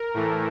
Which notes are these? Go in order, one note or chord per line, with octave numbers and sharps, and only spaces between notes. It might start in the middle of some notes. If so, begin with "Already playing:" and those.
Already playing: A#4
A2 E3 A3